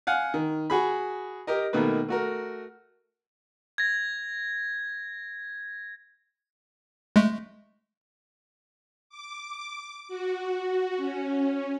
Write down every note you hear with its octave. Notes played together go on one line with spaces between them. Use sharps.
F5 F#5 G#5
D#3
F#4 G#4 B5
G4 A#4 D#5
B2 D#3 A3 A#3 B4
A3 F#4 A#4
G#6 A#6
G#3 A3
D6
F#4
C#4